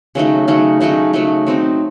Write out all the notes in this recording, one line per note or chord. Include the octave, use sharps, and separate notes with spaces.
C#3 F#3 A3 D#4
C#3 F#3 A3 D#4
C#3 F#3 A3 D#4
C#3 F#3 A3 D#4
F#3 C4 D#4